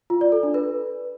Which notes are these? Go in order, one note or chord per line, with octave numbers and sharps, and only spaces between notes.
F4
D5
A4
D4
B4